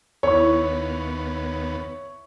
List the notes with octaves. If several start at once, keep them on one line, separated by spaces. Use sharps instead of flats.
D#2 B3 E4 C#5 C#6